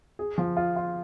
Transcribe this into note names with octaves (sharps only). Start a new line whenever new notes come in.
G#4
F3
F4
F4